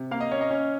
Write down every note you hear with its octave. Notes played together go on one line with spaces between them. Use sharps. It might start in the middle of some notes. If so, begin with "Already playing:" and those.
Already playing: C3
A#3 F5
D#5
C#4 C#5
D#5
C#4